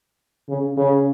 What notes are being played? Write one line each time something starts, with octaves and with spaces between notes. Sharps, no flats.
C#3
C#3